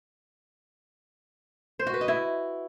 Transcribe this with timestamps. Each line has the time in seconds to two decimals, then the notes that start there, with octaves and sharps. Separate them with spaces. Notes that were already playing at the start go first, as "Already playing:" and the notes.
1.79 C5
1.87 F#4
1.94 B4
2.01 D#5
2.08 E4